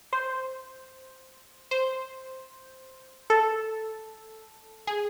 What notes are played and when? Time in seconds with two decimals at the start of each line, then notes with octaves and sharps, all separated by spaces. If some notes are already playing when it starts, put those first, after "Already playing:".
0.13 C5
1.71 C5
3.30 A4
4.87 G#4